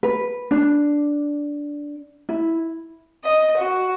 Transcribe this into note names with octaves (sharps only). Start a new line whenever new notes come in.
B4
D4
E4
D#5
F#4